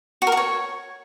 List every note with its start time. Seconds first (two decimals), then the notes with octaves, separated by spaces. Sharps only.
0.22 F#4
0.27 A#4
0.32 F#4
0.37 C#5